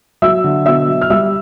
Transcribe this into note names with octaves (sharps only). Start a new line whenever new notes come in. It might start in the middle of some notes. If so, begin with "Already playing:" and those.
F#3 E5 E6
D3
B2 E5 E6
F#3
F6
G3 E5 E6